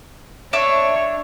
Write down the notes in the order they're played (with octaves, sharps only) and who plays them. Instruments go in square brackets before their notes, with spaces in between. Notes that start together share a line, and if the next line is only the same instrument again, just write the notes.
[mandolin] D4 E5 E6 [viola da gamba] C#5